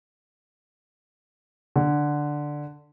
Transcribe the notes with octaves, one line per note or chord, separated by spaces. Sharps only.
D3